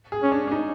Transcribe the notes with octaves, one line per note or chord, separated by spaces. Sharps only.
G#4
C#4
D4
D4
D#4